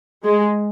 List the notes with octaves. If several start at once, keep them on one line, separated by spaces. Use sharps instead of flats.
G#3